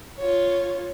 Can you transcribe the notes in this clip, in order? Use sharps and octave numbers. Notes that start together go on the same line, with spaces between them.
F4 C#5